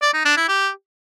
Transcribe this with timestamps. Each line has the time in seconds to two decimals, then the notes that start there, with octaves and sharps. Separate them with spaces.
0.02 D5
0.13 D#4
0.25 D4
0.37 E4
0.48 G4